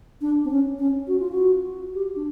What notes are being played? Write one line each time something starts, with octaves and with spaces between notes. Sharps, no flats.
D4
C4
C#4
C#4
F#4
F4
F#4
G4
D4